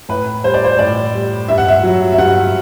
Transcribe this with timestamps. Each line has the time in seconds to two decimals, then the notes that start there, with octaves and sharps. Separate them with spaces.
0.09 A2 B4
0.44 G3 C5
0.54 D5
0.64 C5
0.79 A2 D5
1.15 G3
1.48 G2 E5
1.58 F#5
1.68 E5
1.83 F#3
2.12 E5
2.18 G2 F#5